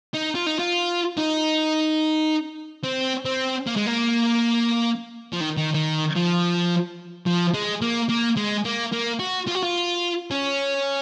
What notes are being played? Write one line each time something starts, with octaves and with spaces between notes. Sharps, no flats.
D#4
F4
D#4
F4
D#4
C4
C4
A#3
G#3
A#3
F3
D#3
D#3
D#3
F3
F3
G#3
A#3
A#3
G#3
A#3
A#3
F#4
F4
F#4
F4
C#4